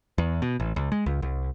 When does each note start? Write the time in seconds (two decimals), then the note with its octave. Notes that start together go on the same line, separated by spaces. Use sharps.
0.18 E2
0.42 B2
0.60 A1
0.76 C#2
0.92 G#3
1.06 C#2
1.22 C2